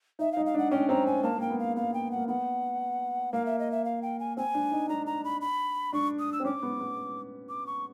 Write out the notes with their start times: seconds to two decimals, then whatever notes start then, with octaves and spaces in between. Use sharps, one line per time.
0.19 D#4 E5
0.32 D#4 F5
0.46 F5
0.54 D4
0.58 F#5
0.71 C#4 G5
0.89 C4 A#5
1.06 G#5
1.23 A#3 A5
1.38 A#3 G5
1.50 B3
1.59 F5
1.76 B3 F5
1.94 G5
2.11 F#5
2.17 A#3
2.28 B3 F#5
3.33 A#3 F5
3.46 E5
3.59 D#5
3.71 E5
3.85 F5
4.02 G5
4.20 G#5
4.37 C4 G#5
4.54 D4
4.71 D#4
4.89 D4 A#5
5.06 A#5
5.24 B5
5.41 B5
5.93 D4 C#6
6.19 D#6
6.33 E6
6.40 C4
6.45 C#4 D6
6.63 B3
6.81 B3
7.49 D6
7.67 C#6